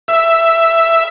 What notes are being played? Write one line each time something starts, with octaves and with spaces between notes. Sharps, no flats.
E5